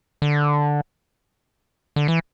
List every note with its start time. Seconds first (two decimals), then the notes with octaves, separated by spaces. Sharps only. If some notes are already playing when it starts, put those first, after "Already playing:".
0.22 D3
1.96 D3
2.08 E3